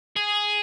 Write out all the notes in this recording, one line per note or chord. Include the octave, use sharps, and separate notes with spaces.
G#4